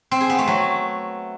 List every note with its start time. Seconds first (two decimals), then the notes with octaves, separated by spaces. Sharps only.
0.11 C4
0.20 G#4
0.30 B3
0.39 A3
0.48 F#3